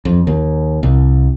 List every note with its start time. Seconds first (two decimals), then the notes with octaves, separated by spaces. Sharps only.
0.05 F2
0.27 D#2
0.83 C2